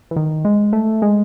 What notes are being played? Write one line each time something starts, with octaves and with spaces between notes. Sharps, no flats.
E3
D#3
G#3
A3
G#3